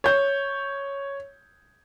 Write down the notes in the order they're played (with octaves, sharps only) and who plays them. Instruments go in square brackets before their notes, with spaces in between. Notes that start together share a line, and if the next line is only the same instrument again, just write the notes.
[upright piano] C#5 G6